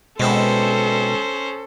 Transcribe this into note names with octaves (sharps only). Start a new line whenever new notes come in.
B2 G#3 C4 C#4 E4 A4 C5